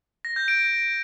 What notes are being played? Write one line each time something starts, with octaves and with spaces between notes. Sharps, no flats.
A#6
G6
D7